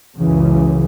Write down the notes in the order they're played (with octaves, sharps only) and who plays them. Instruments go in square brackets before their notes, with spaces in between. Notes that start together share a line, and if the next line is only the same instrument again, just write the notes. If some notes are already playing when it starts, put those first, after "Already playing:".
[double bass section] C#2 F#2 C#3 [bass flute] E3